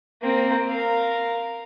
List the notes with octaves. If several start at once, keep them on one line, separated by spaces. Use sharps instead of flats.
A#3 C4
A#4 F5